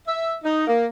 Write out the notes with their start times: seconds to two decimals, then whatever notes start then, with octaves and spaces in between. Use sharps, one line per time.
0.07 E5
0.44 D#4
0.67 A#3